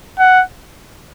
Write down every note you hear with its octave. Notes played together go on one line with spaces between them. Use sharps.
F#5